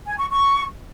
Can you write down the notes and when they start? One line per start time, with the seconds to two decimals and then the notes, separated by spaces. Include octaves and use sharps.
0.06 G#5
0.18 C#6
0.29 C#6